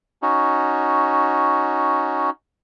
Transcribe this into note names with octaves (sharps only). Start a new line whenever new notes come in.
C#4 D#4 F#4